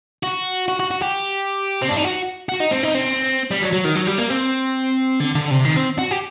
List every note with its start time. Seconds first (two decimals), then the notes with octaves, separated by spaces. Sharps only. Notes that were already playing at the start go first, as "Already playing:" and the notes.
0.23 F#4
0.68 F#4
0.80 F#4
0.91 F#4
1.02 G4
1.82 C4
1.89 D4
1.97 D#4
2.04 F#4
2.49 F#4
2.60 D#4
2.71 C4
2.83 D#4
2.95 C4
3.51 G3
3.62 F#3
3.73 F#3
3.85 D#3
3.95 F#3
4.07 G3
4.18 A#3
4.30 C4
5.20 D3
5.35 D3
5.51 C3
5.65 D#3
5.76 C4
5.99 F#4
6.11 G4